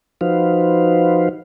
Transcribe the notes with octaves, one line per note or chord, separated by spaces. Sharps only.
F3 D#4 F#4 B4 C5 F5